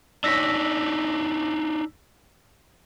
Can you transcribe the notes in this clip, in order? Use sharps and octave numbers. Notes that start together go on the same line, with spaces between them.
D4 D#4 C#5 E6 A#6 B6